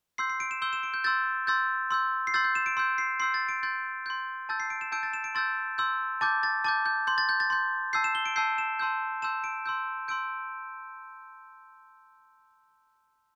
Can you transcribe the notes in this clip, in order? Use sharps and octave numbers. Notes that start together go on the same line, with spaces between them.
C6 E6 G6 C7
C7
D7
E7
C6 E6 G6 G7
E7
D7
G6
C6 E6 G6 A6
C6 E6 G6 A6
C6 E6 G6
C7
C6 E6 G6 A6
G6
E7
D7
C6 E6 G6
C7
C6 E6 G6 C7
A6
D7
C6 G6 A6
C6 G6
A5 E6 G6 A6
C7
D7
E7
A5 E6 G6 D7
A6
E7
D7
C6 E6 G6 A6
C6 E6 G6
A5 D6 G6 A6
A6
A5 D6 G6 A6
G6
C6 G6
A6
G6
A6
C6 G6
A5 E6 G6 C7
E7
G7
D7
A5 E6 G6 C7
E7
A5 C6 E6 G6
A5 C6 E6 G6 E7
D7
C6 E6 G6
C6 E6 G6 D7